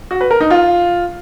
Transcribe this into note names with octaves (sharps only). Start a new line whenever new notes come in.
F#4
B4
A#4
D#4
F4